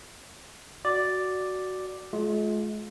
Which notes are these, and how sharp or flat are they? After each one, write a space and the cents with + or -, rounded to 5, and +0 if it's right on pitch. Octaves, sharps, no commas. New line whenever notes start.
F#4 +5 D5 +0
G#3 +40 F4 +15